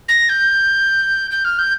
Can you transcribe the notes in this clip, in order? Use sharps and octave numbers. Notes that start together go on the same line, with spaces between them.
A#6
G6
G6
F6
G6